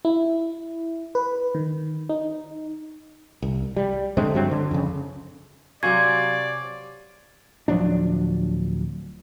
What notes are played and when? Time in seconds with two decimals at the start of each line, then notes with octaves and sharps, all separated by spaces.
0.05 E4
1.15 B4
1.55 D#3
2.09 D#4
3.42 C2
3.77 G3
4.17 D3 G#3 A3 C4
4.35 G2 F#3 C4
4.51 D3
4.71 F2 C#3
5.83 C3 F#3 C4 D5 F5 G#5 C#6 G#6
7.68 D1 F3 F#3 D4